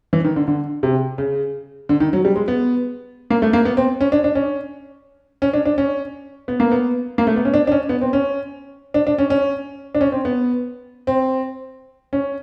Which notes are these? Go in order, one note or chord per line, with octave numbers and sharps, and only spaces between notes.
E3
D#3
D3
D3
C3
C#3
D3
D#3
F#3
G3
G#3
B3
A#3
A3
A#3
B3
C4
C#4
D4
D4
C#4
C#4
D4
D4
C#4
B3
A#3
B3
A#3
A3
B3
C#4
D4
D4
C#4
B3
C4
C#4
D4
D4
C#4
C#4
D4
C#4
C4
B3
C4
C#4